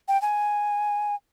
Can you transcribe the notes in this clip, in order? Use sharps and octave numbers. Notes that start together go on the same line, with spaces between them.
G5
G#5